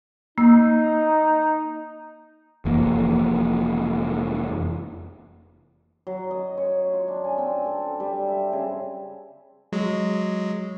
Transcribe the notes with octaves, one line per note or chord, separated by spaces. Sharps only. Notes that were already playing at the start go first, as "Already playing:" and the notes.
A#3 D#4 E6
F1 F2 E3 A#3
F#3
D#5
C#5
F4
D4
G#5
C4
A4
G3
E5
C#3
F#3 G#3